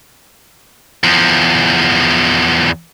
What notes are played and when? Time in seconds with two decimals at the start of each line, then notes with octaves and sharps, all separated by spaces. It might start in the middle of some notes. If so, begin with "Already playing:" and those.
1.04 E2 F3